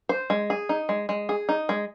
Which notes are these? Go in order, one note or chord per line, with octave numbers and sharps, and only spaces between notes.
C5
G#3
G#4
D#4
G#3
G#3
G#4
D#4
G#3